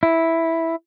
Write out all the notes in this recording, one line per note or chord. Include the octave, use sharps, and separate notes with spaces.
E4